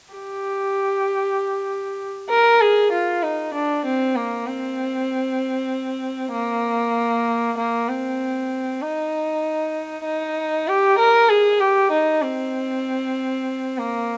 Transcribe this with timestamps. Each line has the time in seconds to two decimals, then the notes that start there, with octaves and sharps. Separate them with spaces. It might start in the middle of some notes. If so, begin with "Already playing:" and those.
0.13 G4
2.30 A#4
2.61 G#4
2.92 F4
3.22 D#4
3.54 D4
3.85 C4
4.15 A#3
4.47 C4
6.33 A#3
7.57 A#3
7.88 C4
8.82 D#4
10.05 D#4
10.68 G4
10.98 A#4
11.29 G#4
11.60 G4
11.91 D#4
12.22 C4
13.78 A#3